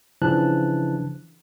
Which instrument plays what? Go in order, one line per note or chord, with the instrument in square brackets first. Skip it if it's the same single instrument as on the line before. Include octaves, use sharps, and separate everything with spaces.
[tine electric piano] C#3 E3 F3 D4 A5 F#6